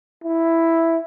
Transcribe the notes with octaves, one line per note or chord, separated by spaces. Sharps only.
E4